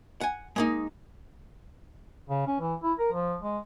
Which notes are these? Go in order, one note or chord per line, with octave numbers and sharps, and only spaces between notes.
F#5 G#5
G#3 A#3 D#4
C#3
C#4
E3
E4
A#4
F3
G#3